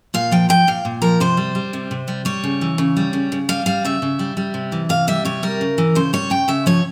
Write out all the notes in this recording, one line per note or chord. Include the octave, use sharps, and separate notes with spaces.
A#2 F5
F3 G5
F3 G5
A#2 F5
A#2
F3 A#4
C3 C5
G3
G3
C3
C3
G3
G3 C#5
C#3
E3
C#3
G3
C#3
C#3
G3 F5
G3 F5
C#3 E5
C#3
G3
G3
C3
E3
C3 F5
G3 E5
C3 C#5
G3 A#4
C#3
E3
C#3 C5
G3 C#5
C#3 G5
C#3 E5
F3 C#5